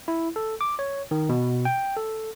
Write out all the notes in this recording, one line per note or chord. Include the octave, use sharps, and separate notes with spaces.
E4
A4
D6
C#5
D#3
B2
G5
A4